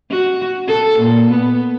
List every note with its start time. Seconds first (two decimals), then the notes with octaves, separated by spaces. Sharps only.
0.11 F#4
0.67 A4
0.99 A#2
1.31 B3